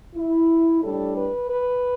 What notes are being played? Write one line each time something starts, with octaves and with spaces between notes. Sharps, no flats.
E4
A2 G3 D4 A4
B4
B4